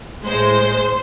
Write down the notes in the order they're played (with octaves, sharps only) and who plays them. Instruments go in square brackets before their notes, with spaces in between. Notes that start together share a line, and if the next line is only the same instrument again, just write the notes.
[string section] A2 G#3 C5